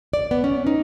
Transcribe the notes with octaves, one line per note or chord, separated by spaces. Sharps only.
D5
B3
C#4
D#4